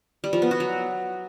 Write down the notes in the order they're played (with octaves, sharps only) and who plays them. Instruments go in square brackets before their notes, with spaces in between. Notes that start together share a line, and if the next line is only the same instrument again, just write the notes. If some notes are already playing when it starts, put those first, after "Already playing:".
[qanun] G3
F3
B3
F#4
F#3